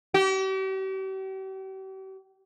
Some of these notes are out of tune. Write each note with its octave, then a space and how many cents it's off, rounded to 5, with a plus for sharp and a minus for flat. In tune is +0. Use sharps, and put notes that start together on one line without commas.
G4 -40